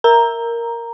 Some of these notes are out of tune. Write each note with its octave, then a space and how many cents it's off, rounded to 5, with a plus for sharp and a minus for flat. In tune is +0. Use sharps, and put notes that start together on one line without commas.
A#4 +0 A#5 +0